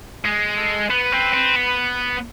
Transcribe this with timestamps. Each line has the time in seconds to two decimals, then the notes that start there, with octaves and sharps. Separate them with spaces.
0.24 G#3 G#4
0.57 A4
0.89 B3 B4
1.12 C4
1.34 C4
1.56 B3